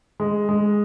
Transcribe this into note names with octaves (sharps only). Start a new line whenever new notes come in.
G#3
G#3